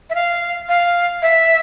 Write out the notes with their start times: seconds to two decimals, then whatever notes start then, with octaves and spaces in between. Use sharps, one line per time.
0.10 E5
0.15 F5
0.69 F5
1.22 E5